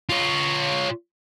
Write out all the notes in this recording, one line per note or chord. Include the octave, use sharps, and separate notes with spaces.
F4 C#5